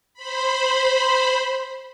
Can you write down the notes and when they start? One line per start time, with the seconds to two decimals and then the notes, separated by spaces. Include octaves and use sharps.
0.14 C5 B5